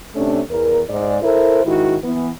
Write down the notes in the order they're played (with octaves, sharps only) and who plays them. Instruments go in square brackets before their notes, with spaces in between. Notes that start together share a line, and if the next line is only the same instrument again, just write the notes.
[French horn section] C3 A3 C#4 D4
E2 A#4
G#2 D5
E4 A4 A#4 C5
G#2 D#3 E4 F#4
E3 B3